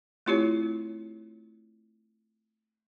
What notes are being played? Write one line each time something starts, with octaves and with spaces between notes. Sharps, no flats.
A3 C4 E4 F4 G4 C#5